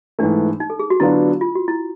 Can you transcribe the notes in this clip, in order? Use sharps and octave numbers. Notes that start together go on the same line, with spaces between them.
G#2 E3 A3 D4
D#4
A4
G#4
F#4
D3 F#3 B3 D4 E4 F4
F4
F#4
E4